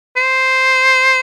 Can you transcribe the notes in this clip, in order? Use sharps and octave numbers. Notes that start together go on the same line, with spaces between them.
C5